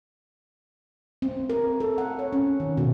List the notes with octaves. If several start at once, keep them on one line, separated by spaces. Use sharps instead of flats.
C4
A#4
A4
F#5
C#5
C#4
D#3
B2